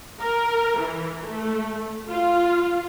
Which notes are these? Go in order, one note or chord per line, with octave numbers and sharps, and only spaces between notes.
A#4
E3
A3
F4